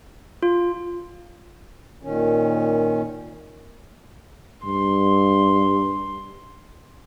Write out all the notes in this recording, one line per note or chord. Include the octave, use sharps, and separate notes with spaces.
F4
A#2 D#3 C#4
G2 C6